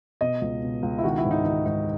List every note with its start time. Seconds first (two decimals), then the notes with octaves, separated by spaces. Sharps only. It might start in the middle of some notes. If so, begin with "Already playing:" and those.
0.21 B2 D#5
0.41 C#2
0.62 B2
0.83 C#2
0.98 E4
1.04 D#3 F#4
1.17 E4
1.25 G#2
1.31 D#4
1.45 D#3 D#4
1.66 G#2 D#4